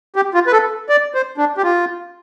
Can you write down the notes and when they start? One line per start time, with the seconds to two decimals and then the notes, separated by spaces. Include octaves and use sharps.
0.16 G4
0.34 F4
0.47 B4
0.52 A4
0.89 D5
1.14 C5
1.38 D4
1.57 G4
1.63 F4